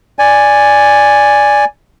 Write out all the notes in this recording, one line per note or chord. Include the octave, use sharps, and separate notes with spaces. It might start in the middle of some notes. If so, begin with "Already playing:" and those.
D5 G#5